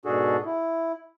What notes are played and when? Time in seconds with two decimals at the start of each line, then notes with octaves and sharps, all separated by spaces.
0.05 G#2 B2 D4 F#4 G#4 A4
0.46 E4